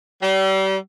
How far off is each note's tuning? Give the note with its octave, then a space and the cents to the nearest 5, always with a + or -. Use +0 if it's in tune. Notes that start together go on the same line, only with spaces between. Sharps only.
G3 -35